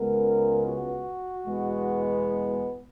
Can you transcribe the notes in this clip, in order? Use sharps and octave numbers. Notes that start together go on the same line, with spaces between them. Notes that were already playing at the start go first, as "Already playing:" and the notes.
Already playing: C#2 C#3 G#3 B3 A#4
F#4
E2 B2 G#3 B3